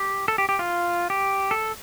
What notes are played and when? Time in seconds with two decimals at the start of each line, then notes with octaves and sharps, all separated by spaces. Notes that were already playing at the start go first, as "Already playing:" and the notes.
Already playing: G4
0.28 A4
0.38 G4
0.49 G4
0.59 F4
1.10 G4
1.51 A4